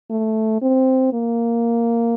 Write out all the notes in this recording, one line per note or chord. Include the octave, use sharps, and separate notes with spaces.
A3
C4
A#3